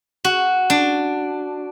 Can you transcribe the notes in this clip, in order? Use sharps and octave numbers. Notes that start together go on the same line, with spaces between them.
F#4
D4